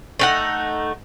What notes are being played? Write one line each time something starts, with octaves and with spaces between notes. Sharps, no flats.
A3 D#4 F#5